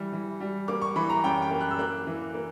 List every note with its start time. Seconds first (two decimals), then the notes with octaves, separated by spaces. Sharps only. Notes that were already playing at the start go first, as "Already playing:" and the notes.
Already playing: E3 G3
0.12 E3
0.40 G3
0.68 A#3 D6
0.81 C#6
0.96 E3 B5
1.09 A#5
1.23 F#2 G5
1.42 G5
1.51 A#3
1.61 F#6
1.71 E6
1.79 A#3 F#6
2.07 E3
2.34 A#3